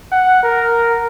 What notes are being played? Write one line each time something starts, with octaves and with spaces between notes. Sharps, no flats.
F#5
A#4